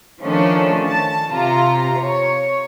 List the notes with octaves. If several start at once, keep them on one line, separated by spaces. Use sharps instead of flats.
D#3 F3 A3 C#4 D4
A5
C3 F4 A#5
C#5